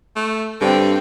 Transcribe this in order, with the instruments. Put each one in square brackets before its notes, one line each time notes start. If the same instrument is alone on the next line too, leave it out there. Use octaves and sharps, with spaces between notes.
[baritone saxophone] A3
[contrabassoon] G2 [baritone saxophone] D3 [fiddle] C4 G5